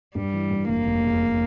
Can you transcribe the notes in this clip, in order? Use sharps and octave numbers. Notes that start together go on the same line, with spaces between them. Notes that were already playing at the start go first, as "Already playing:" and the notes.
G2 G3
E3
G2
F1 A#3
F1
E2